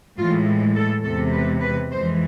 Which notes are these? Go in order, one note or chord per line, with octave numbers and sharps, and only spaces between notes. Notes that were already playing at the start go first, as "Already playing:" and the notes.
A2 E3 G#3 F4
A4
E2 C3 G#3 A4
B4
B4
F2 E3 G#3 C5